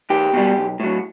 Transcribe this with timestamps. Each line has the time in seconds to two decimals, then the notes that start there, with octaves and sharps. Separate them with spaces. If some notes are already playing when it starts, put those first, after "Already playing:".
0.10 E2 G4
0.33 B2 G3
0.56 B1
0.80 A2 F#3